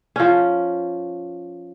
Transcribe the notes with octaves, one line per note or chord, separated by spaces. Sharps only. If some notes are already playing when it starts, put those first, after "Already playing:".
F3 C#4